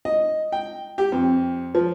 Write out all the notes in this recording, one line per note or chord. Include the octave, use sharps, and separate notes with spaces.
D#5
G5
G4
F2
F3